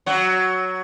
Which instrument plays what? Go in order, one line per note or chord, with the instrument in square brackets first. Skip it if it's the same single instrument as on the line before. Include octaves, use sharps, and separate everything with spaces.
[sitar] F#3 F#4